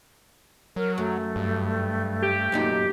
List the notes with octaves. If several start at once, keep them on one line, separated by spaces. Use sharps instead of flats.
F#3 A#4
F#2 A3
G2
G4
F#2 A#2 D#4